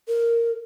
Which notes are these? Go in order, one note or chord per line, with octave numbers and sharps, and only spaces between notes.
A#4